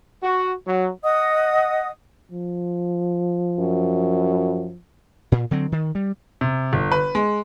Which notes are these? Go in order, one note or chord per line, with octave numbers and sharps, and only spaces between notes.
F#4
F#3
D#5 F#5 D#6
F3
F#2
A#2
D3 F#3 C4
D#3
G3
C3
G1
B4
G#3